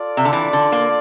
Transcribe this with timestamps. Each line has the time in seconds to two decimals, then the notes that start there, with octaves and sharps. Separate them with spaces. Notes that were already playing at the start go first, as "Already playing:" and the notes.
Already playing: F4 A4 D5
0.17 C3
0.25 D3
0.33 E3
0.53 D3
0.72 A#3